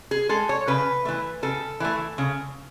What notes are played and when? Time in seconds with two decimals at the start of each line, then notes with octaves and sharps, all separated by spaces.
0.11 G#4
0.29 G#3 A4
0.49 C#5
0.67 C#3 B4
1.05 E3 A3
1.43 C#3 A4
1.80 E3 A3
2.18 C#3